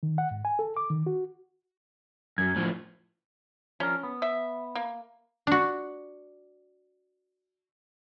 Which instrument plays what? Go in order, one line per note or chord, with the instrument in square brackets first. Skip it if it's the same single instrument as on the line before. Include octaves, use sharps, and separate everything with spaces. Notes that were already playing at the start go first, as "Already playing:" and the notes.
[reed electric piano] D#3
F#5
G#2
G#5
A4
D6
D#3
F#4
[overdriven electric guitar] F#2 [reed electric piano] G#6
[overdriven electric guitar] A2 F3
[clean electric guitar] F3 D4 A#4 [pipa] C#4
[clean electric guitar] B3
[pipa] E5
A#3
[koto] D4 F#4